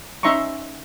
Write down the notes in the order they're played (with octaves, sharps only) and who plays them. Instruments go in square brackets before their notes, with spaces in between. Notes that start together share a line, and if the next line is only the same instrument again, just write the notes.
[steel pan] C#4 D#4 E5 A#5 C6 C#6